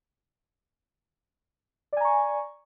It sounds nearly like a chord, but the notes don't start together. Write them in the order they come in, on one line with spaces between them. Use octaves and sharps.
D5 G#5 A#5 C#6